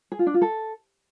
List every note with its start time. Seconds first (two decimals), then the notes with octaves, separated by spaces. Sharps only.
0.12 G#4
0.19 F4
0.27 D4
0.34 F4
0.42 A4